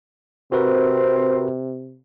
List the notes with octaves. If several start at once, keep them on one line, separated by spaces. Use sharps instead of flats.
C3 C4 F#4 A#4 B4